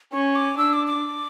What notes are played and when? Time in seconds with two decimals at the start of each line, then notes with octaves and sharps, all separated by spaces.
0.13 C#4 C#6
0.36 D6
0.58 D4 E6
0.73 D6
0.87 D6